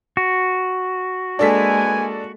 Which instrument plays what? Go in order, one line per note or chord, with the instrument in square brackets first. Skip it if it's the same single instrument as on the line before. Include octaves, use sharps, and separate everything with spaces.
[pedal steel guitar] F#4
[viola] G#3 A#3 [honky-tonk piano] D4 A4 B6 [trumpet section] B4 G#5